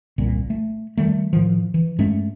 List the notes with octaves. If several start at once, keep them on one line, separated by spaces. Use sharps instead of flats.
G1 C2 A#2
A3
D#3 G3 A3
A2 D#3 F3
E3
G2 G#3 A3 C#4